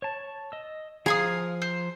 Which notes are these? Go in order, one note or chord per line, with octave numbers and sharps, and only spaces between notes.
C#5 A5
D#5 E6
F3 G#4 F5 G#5 A#5 C6 D#6
C5